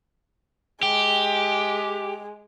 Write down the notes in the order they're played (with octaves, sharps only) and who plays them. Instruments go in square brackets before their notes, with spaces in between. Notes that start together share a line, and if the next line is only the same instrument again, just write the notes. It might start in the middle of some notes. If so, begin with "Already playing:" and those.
[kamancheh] G#3 [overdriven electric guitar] G4